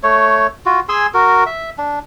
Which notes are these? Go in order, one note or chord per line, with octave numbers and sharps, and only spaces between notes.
A3 C#5
F4 F#4
G#4 G#5 C6 E6
F#4 A#4
E5
D4